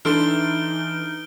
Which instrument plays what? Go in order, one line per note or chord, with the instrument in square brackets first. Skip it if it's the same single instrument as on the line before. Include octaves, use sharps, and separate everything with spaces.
[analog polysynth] E3 [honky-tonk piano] D4 A4 C6 [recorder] D#4 [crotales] F6 D7 G7